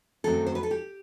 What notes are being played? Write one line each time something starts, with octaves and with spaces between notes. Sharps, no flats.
F#2 D#3 F#3 A3 C4 A4
C5
B4
A4
G4